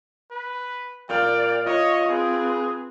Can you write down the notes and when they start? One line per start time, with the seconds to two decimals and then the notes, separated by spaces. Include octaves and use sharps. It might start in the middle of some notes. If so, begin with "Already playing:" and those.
0.31 B4
1.09 A#2 D5 F5 G5
1.66 F4 C#5 D#5
2.09 C4 G#4 B4